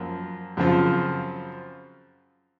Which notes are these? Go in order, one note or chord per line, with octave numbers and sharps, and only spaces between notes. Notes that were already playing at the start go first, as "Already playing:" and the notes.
Already playing: F#2 F3 A#3
F#2 C#3 F3 C4 F4